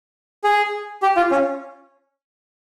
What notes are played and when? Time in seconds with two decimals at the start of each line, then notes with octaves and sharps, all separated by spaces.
0.44 G#4
1.02 G4
1.17 F4
1.31 C#4